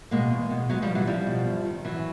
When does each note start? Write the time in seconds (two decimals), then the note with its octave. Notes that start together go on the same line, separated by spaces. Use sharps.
0.11 B2 G#3 A#3
0.31 E2
0.51 B2
0.69 E2 F#3 G#3
0.82 F3 G3
0.89 B2
0.95 E3 F#3
1.07 E2 F3 G3
1.27 B2
1.46 F#2
1.65 D#3
1.85 F#2 E3 F#3